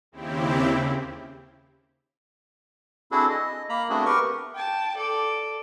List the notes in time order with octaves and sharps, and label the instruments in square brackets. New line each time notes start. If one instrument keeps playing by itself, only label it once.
[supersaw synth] D#2 C#3 C4 E4 G4
[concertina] C4 D4 E4 F#4 G#4 A4
D#5
A#3 A#5 B5
A3 B3 C4 D4 F#4 G#4
G4 A#4 B4 C#6
[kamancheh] G5 A5
A4 D5